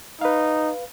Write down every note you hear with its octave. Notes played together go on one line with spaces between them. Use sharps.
D#4 B4 F5